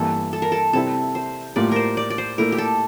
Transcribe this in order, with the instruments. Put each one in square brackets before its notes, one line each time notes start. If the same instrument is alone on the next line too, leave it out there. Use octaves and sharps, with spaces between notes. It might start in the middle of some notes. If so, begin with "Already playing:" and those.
Already playing: [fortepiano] G2 E3 A#3 E4 [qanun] A4
[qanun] A4
A#4
A4
[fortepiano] C3 G3 C4 E4 [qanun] A4
[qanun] C5
[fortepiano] A2 G3 A#3 F4 [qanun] D5
[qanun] A#4 C5
D5
D5
C5
[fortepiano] A#2 A3 E4 [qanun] A#4
[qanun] G4
A4